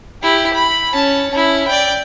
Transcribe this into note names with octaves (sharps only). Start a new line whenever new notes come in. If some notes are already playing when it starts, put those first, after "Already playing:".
E4 G4
B5
C#4 A5
C#4 E4
D5 G5